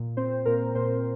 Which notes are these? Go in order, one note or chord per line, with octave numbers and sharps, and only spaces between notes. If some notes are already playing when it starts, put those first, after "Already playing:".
Already playing: A#2
C4 C5
A#2 A#4
A#2 C5